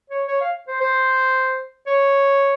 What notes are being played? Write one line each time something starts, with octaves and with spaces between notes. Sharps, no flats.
C#5
C#5
F5
C5
C5
C#5